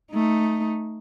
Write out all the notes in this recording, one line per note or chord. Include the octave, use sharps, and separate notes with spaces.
A3 D#4